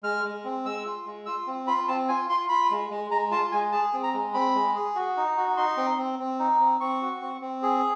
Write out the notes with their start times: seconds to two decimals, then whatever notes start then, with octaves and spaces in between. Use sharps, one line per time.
0.03 G#3 F6
0.24 G#3
0.44 C4
0.65 G#3 E6
0.85 F4
1.05 G#3
1.26 F4 E6
1.47 C4
1.67 F4 B5
1.88 C4 A5
2.08 F4 G#5
2.29 F4 C6
2.49 F4 B5
2.71 G#3
2.90 G#3
3.11 G#3 A#5
3.31 F4 A5
3.52 G#3 G#5
3.72 G#4 A5
3.93 C4
4.03 A#5
4.14 G#3
4.34 C4 B5
4.55 G#3
4.75 G#4
4.95 F#4
5.17 D#4
5.37 F#4
5.57 D#4 C6
5.77 C4
5.98 C4
6.19 C4
6.39 D#4
6.60 C4
6.80 C4 C#6
7.01 F#4
7.22 C4
7.41 C4
7.63 G#4